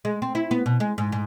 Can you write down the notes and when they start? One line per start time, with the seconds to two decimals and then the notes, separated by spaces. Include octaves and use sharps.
0.05 G#3
0.22 C4
0.35 E4
0.51 B3
0.66 B2
0.80 G#3
0.98 G#2
1.12 G#2